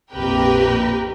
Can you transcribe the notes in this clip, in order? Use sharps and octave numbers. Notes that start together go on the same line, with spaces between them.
A#1 F2 G4 A#4 B4 G5